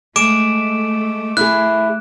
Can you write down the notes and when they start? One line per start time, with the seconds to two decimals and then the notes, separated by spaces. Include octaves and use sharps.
0.16 G#3 A3 D6 D7 E7
1.37 E4 G#4 F#6